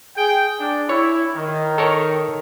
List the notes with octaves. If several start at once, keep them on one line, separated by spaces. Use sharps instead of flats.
G#4 G5
D4
E4 C#5
D#3
A4 A#4 C#5